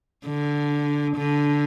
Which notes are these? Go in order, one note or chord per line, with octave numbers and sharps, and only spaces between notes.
D3
D3